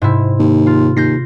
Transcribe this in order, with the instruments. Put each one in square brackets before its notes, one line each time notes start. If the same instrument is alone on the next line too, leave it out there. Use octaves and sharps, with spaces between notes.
[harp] G#2 C3 E4
[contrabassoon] D#2
[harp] F4
[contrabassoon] D#2 [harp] G6 A#6 C7